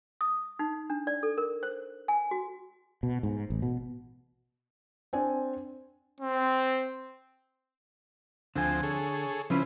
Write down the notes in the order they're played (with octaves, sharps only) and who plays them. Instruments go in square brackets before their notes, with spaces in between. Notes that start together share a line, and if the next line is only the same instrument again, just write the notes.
[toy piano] D#6
D#4
D4
D5
A4
A#4
C5
G#5
F#4
[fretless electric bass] B2
G#2
A1
B2
[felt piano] C4 D4 G#5
[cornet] C4
[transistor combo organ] D2 F3 C4 [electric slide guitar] D3 G#5
[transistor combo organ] G#4 A4 C#5
[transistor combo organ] C#3 E4 C5 [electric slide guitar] F3 C#4 B4